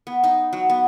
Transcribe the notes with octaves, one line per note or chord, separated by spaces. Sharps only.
B3
D#4
F#3
B3